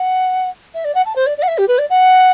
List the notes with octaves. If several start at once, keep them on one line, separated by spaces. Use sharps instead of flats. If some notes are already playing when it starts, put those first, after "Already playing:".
Already playing: F#5
E5
D5
F#5
A5
C5
D5
D5
F#5
E5
G4
B4
D5
F#5